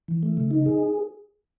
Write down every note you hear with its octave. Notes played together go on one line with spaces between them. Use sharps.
E3
A3
C#3
D#4
G#4